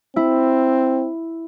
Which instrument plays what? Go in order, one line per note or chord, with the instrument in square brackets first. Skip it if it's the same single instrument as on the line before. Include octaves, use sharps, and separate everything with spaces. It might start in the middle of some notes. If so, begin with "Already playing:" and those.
[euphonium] C4 [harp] E4